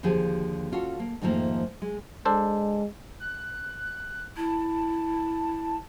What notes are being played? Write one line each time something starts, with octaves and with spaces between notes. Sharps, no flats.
D#2 D3 F3 G4 G#4
C#4 F4 F#4 A4
A#3
F2 G#2 D#3 F3 A3 A#3
G#3
G#3 D4 A4 C5
F#6
E4 A5